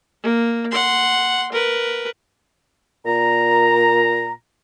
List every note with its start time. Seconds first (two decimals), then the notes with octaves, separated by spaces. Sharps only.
0.23 A#3
0.71 F#5 C6
1.52 A#4 B4
3.06 A#2 A#5